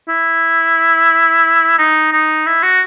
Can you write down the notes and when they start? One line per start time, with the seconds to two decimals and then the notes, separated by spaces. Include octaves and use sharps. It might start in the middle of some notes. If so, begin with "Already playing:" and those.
0.09 E4
1.79 D#4
2.12 D#4
2.46 E4
2.63 F#4